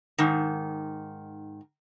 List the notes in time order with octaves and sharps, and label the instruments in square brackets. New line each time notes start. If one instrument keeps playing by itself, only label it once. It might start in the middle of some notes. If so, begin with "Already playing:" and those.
[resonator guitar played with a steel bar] G#2 D#3